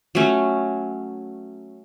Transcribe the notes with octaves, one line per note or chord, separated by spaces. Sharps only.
F#3 A3 C#4